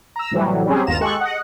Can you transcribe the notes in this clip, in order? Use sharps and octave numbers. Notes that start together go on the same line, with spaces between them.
A#5 E6
A2 C3 E3 F#3 G3
F#3 G3 C4 C#4 G4 G#4
G1 D#2 F4 A#5 E7
G#3 G4 A4 C#6 F#6
D#5 F#5